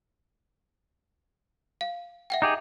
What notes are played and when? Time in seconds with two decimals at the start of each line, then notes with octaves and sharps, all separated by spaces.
1.81 F5
2.30 E5 F#5 G5
2.42 D#4 G4 G#4